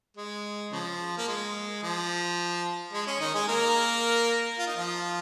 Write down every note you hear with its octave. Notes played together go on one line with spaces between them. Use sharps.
G#3
C#3 F3
A#3
G#3
F3
G#3
C#4
D#3 D#4
G#3 G#4
A#3 A#4
F4
D#4
F3 F4